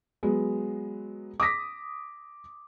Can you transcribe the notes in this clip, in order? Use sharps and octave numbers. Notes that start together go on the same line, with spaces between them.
F#3 G#3 B3
D6 D#6 A#6 B6